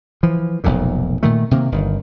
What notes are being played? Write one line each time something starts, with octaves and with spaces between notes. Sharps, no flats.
E3 F3
F1 B1 F2 A#2
A#2 D#3 A3
C3 D#3 A#3
G1 D#3